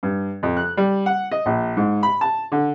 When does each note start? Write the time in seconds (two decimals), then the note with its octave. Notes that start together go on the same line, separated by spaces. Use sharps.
0.03 G2
0.43 F2
0.57 F#6
0.77 G3
1.06 F#5
1.31 D#5
1.46 A#1
1.77 G#2
2.03 B5
2.21 A5
2.52 D3